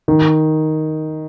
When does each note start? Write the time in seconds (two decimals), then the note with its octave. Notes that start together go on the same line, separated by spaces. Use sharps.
0.08 D#3